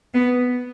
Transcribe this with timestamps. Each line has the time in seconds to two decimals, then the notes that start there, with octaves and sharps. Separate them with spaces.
0.13 B3